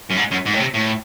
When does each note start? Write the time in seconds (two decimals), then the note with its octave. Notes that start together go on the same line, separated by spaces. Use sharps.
0.10 F#2
0.17 G#2
0.32 F#2
0.46 G#2
0.54 A2
0.60 C3
0.74 A2